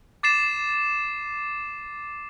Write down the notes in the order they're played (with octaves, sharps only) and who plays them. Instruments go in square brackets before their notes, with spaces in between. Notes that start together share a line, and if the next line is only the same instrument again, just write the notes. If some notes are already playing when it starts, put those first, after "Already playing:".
[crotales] D6 A6 C7 E7